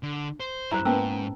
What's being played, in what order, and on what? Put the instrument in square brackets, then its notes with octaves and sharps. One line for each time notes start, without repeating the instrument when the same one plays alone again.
[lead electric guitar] D3
C5
[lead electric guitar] F#2 G3 [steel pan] E4 E5 [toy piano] C5 A#5
[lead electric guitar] G#2 [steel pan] A#3 B3 [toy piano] C#4 A5 E6